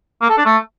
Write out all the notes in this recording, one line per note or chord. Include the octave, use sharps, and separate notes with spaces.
A#3
A4
D4
A3